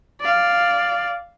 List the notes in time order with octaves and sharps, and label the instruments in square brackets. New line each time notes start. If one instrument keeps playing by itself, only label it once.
[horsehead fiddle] D5 F5